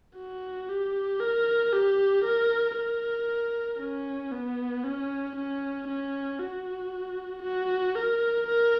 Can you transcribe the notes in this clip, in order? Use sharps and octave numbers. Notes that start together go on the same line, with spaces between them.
F#4
G4
A#4
G4
A#4
A#4
C#4
B3
C#4
C#4
C#4
F#4
F#4
A#4
A#4